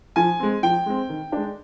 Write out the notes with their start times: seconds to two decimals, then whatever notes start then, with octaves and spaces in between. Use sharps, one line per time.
0.16 F3 G#5
0.40 G#3 C4
0.63 F3 G5
0.86 G#3 C4
1.09 D#3
1.32 G#3 D4